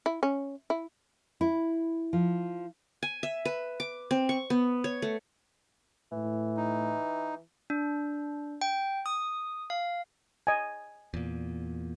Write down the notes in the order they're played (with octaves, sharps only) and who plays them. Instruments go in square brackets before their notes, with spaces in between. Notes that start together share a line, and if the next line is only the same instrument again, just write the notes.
[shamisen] E4
C#4
E4
[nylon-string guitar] E4
F3
[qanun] G#5
E5
B4
D6
C4
C#6
B3
C#5
A3
[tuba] A2 [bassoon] E3
[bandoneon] D#4
[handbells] D4
G5
D#6
F5
[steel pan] D#5 G#5
[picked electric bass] E2 A#2